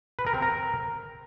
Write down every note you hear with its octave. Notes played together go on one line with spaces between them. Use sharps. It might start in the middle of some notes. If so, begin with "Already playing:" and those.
B4
A#4
C4
A#4